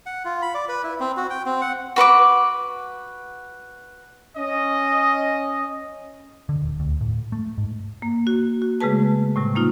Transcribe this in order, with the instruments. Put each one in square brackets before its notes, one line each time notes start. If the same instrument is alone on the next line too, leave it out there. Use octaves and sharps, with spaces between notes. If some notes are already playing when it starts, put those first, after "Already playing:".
[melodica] F#5
F4
B5
D5
B4
E4
C4
F#4
G5
C4
F#5
[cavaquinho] F#4 B4 C#6 D6
[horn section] C#4 D#5
[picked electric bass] D3
D#1
D2
A2
A3
G#2
[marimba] A#3
F#4
F#4
C#3 G#3 A3 G#4 B4 A5
A2 C3 G3
A#3 D#4 F4